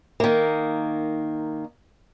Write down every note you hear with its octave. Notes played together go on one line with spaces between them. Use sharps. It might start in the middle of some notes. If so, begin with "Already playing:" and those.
D#3 A#3